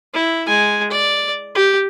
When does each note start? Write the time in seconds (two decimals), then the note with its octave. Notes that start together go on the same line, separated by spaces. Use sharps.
0.14 E4
0.47 G#3 G#5
0.91 D5
1.55 G4